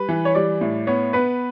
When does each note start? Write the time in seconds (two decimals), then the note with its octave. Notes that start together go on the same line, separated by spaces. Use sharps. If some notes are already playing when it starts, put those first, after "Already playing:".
Already playing: G3 B4
0.09 E3
0.25 C#5
0.35 G3 D5
0.61 A2
0.87 B3 C#5
1.13 B3 B4